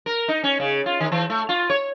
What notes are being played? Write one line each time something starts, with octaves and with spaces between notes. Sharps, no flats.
A#4
D#4
C#4
C#3
F4
D#3
E3
A3
F4
C#5